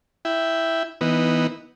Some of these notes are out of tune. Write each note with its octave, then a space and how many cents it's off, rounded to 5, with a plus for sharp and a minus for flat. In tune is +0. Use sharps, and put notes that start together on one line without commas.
E4 +0 G5 +0
E3 -15 B3 +0 D#4 +0